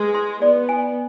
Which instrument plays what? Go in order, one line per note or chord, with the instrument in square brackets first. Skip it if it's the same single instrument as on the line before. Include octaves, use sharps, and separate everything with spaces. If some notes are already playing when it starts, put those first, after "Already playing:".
Already playing: [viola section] G#3 [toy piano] B4
[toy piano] C6
[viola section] B3 [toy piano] D5
[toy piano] G#5